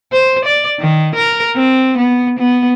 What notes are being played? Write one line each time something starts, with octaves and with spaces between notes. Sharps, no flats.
C5
D5
D#3
A#4
C4
B3
B3